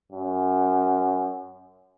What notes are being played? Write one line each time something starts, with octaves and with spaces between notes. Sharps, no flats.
F#2